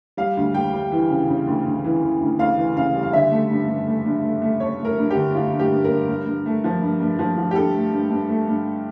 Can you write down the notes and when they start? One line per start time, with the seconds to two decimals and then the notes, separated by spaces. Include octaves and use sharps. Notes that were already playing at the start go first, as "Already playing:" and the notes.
0.17 G3 F5
0.37 D2
0.54 G3 G5
0.73 G3
0.92 E3
1.10 C#3
1.28 C#3
1.47 D2
1.65 D2
1.84 E3
2.02 E3
2.20 D2
2.39 D2 F5
2.57 E3
2.76 C#3 F5
2.94 G3
3.03 F5
3.13 D3 E5
3.31 A3
3.51 G2
3.68 G2
3.87 A3
4.06 G2
4.24 A3
4.42 A3
4.60 A3 C#5
4.80 A3 A#4
4.98 G2
5.10 G4
5.15 D3
5.35 A3 F4
5.53 G2
5.59 G4
5.72 G2
5.84 A#4
5.90 G2
6.08 G2
6.27 G2
6.46 A3
6.64 F3
6.82 G2
7.00 G2
7.19 F3
7.38 F3
7.51 G4
7.55 G2 A4
7.75 A3
7.93 G2
8.11 G2
8.29 A3
8.48 G2